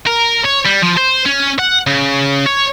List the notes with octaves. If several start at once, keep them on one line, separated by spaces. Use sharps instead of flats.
A#4
C#5
G3
F3
C5
C#4
F#5
C#3
C#5